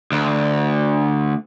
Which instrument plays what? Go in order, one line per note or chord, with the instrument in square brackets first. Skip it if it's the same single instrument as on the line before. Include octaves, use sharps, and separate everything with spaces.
[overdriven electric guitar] D2